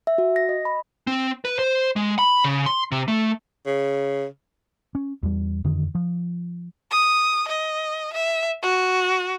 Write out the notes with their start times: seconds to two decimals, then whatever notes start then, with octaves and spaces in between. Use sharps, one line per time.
0.07 E5
0.18 F#4
0.36 A#6
0.49 D#5
0.65 B5
1.07 C4
1.45 B4
1.59 C5
1.96 G#3
2.19 B5
2.44 C#3
2.66 C6
2.92 C3
3.08 A3
3.67 C#3
4.95 C#4
5.23 E2 G3
5.64 F2 D3 D#3
5.95 F3
6.91 D#6
7.48 D#5
8.13 E5
8.62 F#4